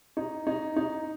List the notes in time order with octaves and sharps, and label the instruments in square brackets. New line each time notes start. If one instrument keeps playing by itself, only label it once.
[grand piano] D#4
D#4
D#4